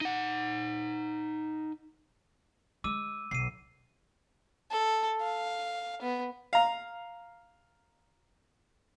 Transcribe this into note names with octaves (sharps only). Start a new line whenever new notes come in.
D#4 F#5
G#3 D6 E6 D#7
B1 C7 D#7
A4
F5
B3
F5 A#5